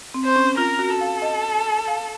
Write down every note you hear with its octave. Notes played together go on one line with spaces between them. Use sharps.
C4
C5
C#4
F4 A#4
F#4
A4
F5
D#5
F5